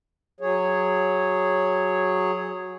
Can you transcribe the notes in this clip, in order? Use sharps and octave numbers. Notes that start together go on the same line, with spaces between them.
F#3 G#4 C#5